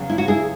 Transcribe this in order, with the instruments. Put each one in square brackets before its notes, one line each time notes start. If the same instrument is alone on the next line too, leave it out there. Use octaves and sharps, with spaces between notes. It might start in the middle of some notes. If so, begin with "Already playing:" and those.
Already playing: [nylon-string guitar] E2 C#3 F#3
E4
F#4
E4 G#4